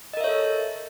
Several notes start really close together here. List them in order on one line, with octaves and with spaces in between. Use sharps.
D#5 A#4 E5 C#5 A4